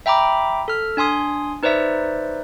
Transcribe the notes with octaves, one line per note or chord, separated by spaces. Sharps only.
E5 G5 A#5 B5 D6
A4 F6
D4 G#5 C6 D#6
D#4 B4 C5 D5 E5